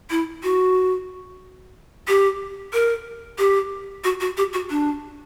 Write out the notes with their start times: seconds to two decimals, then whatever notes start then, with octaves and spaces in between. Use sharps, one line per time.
0.10 E4
0.43 F#4
2.08 G4
2.73 A#4
3.38 G4
4.04 F#4
4.20 F#4
4.37 G4
4.53 F#4
4.70 D4